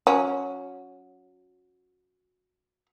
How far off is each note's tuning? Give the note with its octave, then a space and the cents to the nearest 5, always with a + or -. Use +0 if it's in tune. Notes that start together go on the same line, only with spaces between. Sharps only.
F#3 -20 C#4 +0